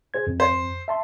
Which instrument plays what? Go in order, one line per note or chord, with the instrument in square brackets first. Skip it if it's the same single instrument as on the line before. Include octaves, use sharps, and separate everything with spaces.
[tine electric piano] G#4 C5 G#6
F2
[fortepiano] C5
[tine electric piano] E5 A5 C6